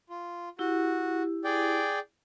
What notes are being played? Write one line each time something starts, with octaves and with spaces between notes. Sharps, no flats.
F4
E4 F#4 G4
G#4 D5 G5